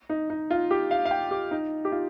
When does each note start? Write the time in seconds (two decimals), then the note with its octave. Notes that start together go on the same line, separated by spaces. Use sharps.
0.10 D#4
0.30 D#4
0.51 F4
0.71 G4
0.91 F5
1.06 F5
1.11 G5
1.31 G4
1.51 D#4
1.85 G4
1.92 F4